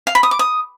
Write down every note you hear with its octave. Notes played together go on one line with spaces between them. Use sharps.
F5
B5
D#6
D6
D#6